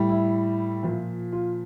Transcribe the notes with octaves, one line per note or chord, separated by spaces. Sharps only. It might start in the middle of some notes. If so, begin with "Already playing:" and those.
Already playing: A2 G3
E4
A#2 F3
F4